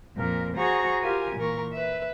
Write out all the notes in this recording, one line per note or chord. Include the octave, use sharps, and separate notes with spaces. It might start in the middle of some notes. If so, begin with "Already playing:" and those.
F2 A#2 A#4
F#4 G#4 C5 A#5 C#6
F4 G4 A#4 G#5
A#2 E3 A#4 C#6
B4 E5